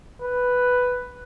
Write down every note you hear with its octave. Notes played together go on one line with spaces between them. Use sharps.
B4